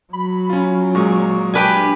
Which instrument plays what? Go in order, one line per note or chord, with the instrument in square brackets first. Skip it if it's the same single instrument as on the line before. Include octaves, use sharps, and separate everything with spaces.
[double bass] F#3 [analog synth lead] B5
[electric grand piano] C#4 F4
[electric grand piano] A#2 G#3 [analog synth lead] C#6
[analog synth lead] D4 [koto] G4 B4 G#5